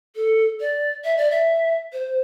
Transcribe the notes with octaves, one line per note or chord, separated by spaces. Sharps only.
A4
D5
E5
D5
E5
C5